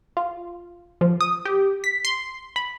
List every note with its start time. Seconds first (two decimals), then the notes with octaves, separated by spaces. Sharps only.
0.17 F4
1.01 F3
1.21 D#6
1.45 G4
1.84 B6
2.05 C6
2.56 B5